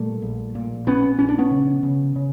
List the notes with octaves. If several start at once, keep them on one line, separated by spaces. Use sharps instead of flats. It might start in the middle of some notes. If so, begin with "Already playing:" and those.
Already playing: A#2 G3 A3
A#1
A#2
A#1 B3 C#4
A#1 C#4
D4
B3 C#4
C#3
C#3
C#3